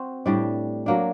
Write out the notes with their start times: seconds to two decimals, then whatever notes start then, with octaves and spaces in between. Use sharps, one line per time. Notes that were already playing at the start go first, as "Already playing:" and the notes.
Already playing: C4 F#4 C5
0.26 A2 G3 D4
0.86 F#3 A#3 D4